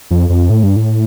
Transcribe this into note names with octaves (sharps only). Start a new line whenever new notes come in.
F2
F2
A2
G2
A2